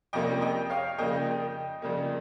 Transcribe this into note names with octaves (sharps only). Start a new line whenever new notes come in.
F2 C3 G3 A#3 C#4 D#5 G5
D#5 G5
C#5 F5
F2 C#3 G3 A#3 D#5 G5
F2 C#3 G3 A#3